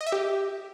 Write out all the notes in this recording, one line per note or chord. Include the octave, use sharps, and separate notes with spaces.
D#5
E5
G4